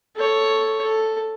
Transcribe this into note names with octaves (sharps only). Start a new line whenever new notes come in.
A4 C#5
A4